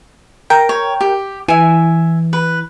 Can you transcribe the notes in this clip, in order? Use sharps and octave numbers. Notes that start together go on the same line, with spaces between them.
A#4 G5 A#5
C#5
G4
E3 E5 G#5
B4